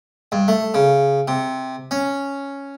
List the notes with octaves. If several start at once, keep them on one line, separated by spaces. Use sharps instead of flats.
G2
A3
C#3
C3
C#4